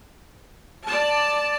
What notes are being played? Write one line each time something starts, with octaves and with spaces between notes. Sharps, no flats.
D5 A5